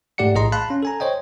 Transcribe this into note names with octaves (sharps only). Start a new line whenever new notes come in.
G#2 A3 G4 D5 F#5 C#7
A#1 A2 G#4 D#5 A#5 C6
F5 A5 B5 C6 F#6
C#4
A4 G#5 A#5
C5 C#5 D#5 G5